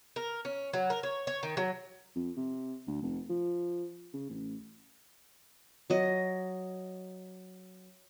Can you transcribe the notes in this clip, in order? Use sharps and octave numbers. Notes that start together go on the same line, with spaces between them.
A#4
C#4
F#3
A#4
C#5
C#5
D#3
F#3
F2
C3
D2
F1
F3
C#3
A1
F#3 D#5